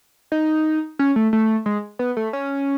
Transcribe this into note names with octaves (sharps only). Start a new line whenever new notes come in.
D#4
C#4
A3
A3
G#3
B3
A3
C#4